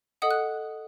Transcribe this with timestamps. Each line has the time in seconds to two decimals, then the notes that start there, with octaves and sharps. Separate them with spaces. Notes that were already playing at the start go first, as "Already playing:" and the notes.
0.22 A4 D#5 F#5 D#6
0.31 F#6